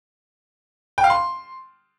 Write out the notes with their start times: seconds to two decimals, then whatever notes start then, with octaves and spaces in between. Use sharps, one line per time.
0.98 G5
1.04 F5
1.10 C6